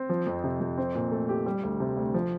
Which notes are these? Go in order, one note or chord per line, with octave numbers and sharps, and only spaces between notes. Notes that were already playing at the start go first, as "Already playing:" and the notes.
Already playing: C4
F3
F2
C3
F2
C4
A#2
A3
G4
G3
D2
C3
D2
F3